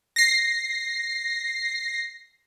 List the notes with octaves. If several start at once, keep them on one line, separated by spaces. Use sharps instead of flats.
A#6 C7